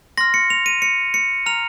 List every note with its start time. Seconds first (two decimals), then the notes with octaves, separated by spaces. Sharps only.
0.18 C6 F6 A#6
0.34 C#7
0.50 F7
0.66 D#7
0.82 C#7
1.14 C#7
1.46 A#5 F6 F7